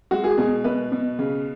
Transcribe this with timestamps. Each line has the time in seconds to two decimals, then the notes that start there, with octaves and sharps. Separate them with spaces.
0.11 G#3 F#4
0.24 G#4
0.38 B2 G#4
0.64 B2 B4
0.92 B2
1.19 C#3